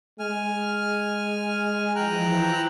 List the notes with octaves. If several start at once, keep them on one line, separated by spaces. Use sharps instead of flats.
G#3 G#5 F6
E3 F3 E4 G5 A#5 F#6